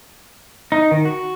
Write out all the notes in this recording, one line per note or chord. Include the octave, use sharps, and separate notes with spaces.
D#4
D#3
F#4